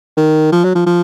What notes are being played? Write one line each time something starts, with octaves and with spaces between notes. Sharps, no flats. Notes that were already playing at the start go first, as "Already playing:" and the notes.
D#3
F3
F#3
F3
F3